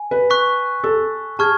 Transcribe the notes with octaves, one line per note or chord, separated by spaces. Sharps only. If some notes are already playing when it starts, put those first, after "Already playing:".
Already playing: G#5
B4
C#6 F#6 B6
A4
G#4 A5 C#6 F6 G#6